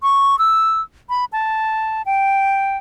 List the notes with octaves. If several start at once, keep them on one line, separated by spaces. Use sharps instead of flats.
C#6
E6
B5
A5
G5